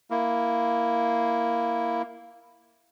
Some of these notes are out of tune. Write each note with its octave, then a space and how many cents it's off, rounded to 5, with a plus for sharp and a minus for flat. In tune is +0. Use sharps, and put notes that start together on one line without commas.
A#3 +0 E4 +0